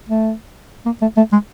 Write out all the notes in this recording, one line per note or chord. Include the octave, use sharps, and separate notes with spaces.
A3
A#3
A3
A3
G#3